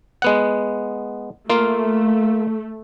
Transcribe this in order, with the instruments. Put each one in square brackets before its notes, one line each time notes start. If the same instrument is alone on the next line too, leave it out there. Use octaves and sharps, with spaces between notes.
[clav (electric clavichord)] G#3 B3 F#5
[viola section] A3 [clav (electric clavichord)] A#3 F4 F5